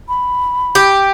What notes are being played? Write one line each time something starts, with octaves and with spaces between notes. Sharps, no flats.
B5
G4